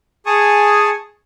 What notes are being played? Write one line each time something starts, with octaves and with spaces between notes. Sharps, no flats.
G#4 G#5 A5 C#6 D#6